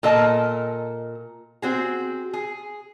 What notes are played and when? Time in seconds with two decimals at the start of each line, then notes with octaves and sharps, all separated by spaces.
0.03 A#2 A4 A#4 D#5 A5
1.62 C4 F#4 G#4
2.33 G#4